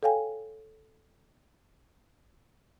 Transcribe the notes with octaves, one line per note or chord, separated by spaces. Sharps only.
A4 C#5 F5 G5 G#5